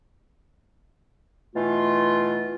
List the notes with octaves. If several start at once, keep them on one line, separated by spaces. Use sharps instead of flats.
B2 E3 A3 F4